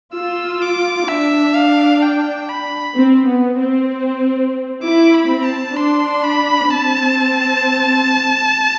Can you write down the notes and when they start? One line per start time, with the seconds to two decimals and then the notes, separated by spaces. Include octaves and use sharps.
0.15 F4 E6
0.62 D6
1.09 D4 E5
1.55 F5
2.02 G5
2.49 B5
2.96 C4
3.27 B3
3.59 C4
4.83 E4 D6
5.14 B5
5.30 C4
5.46 A5
5.77 D4 C6
6.23 B5
6.70 C4 A5